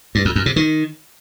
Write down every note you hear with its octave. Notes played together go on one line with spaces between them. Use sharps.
G2
F2
F#2
C3
D#3